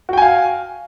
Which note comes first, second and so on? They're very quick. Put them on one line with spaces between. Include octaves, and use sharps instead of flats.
F#4 G5 G#5 F5